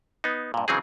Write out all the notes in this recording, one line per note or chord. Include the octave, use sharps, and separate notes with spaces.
B3 D#4
G2 A#2
C#3 E3 F#3 C4 D#4 G#4